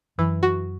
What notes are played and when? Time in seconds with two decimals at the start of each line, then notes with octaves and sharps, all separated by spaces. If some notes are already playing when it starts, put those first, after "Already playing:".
0.18 F#2 E3
0.43 F#4